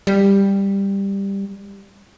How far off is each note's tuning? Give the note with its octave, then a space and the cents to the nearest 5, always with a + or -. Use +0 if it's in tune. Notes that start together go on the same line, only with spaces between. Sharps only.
G3 +10